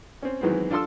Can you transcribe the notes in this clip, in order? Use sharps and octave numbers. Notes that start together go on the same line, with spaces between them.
C4 C#4
D#3 E3 F#3 G#3 B3 C4
D4 F4 A4 C6 E6